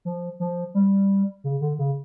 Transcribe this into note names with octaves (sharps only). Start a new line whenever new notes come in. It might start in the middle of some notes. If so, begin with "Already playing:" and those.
F3
F3
G3
C#3
D3
C#3